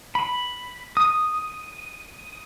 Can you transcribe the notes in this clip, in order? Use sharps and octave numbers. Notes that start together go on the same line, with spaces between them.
B5
D#6